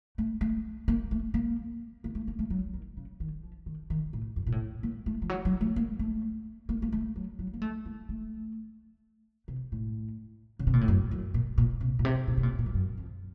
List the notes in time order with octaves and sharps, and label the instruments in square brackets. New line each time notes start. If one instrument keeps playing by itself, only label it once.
[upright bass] A3
A3
A#3
A3
A#3
A#3
A3
A#3
A3
F#3
D#3
C#3
D#3
F3
D#3
D#3
A2
F#2
A#2
A2
A#3
A3
F3
F#3
F#3
A3
A#3
A3
A#3
A#3
A3
F#3
F#3
A#3
A3
A#3
A3
C3
A2
C#3
C3
A#2
A2
F#2
F#2
A#2
A#2
C3
A#2
C3
A#2
C3
A#2
A#2
F2
F#2
F2